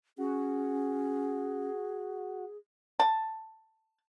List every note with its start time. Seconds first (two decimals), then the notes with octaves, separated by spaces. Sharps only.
0.18 C#4 F#4 G#4
3.00 A5